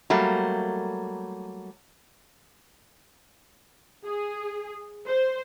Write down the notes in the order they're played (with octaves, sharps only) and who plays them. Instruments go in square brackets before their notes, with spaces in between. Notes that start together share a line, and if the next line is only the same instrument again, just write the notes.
[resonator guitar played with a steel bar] F#3 G3 A3 A#3
[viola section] G#4
C5